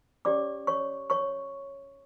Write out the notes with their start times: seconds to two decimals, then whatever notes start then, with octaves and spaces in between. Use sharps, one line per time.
0.25 C#4 G4 C#5 D5 D6
0.67 C#5 C#6
1.10 C#5 C#6